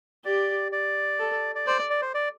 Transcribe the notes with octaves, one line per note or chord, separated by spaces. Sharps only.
G4 D5
D5
A4
D5
C5 D5
D5
C5
D5